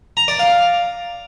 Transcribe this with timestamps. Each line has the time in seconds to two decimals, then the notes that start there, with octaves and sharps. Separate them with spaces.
0.17 A#5
0.28 D5
0.39 F5